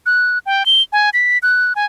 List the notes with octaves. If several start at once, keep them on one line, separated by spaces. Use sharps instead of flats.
F#6
G5
G7
G#5
B6
F#6
G#5